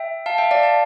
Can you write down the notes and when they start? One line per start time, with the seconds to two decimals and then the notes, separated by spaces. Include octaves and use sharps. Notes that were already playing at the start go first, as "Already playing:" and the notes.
Already playing: E5 G5
0.26 F5 A5
0.38 E5 G5
0.51 D5 F5
0.63 A5